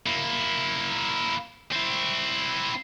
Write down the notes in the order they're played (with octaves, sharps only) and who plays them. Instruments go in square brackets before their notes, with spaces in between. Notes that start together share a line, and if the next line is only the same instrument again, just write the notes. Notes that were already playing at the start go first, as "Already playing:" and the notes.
[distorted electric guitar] A#3 E4
C4 E4